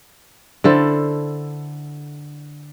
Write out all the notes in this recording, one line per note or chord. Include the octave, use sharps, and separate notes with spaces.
D3 E4 A4 C5